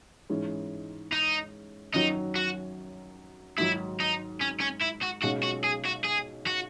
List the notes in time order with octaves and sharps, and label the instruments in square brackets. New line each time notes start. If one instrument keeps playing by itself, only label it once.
[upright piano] G#2 E3 G#3 C#4
[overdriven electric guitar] D#4
[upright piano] F#2 D#3 F#3 [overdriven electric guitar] D#4
[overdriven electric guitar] F#4
[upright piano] G#2 D#3 F#3 [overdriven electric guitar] E4
[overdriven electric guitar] D#4
C#4
C#4
E4
F#4
[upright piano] B1 B2 G#3 C#4 [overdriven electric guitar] F#4
[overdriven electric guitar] F#4
G#4
F#4
G#4
F#4